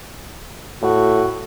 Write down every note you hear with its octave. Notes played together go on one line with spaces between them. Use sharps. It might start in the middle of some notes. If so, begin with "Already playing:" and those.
A2 F#4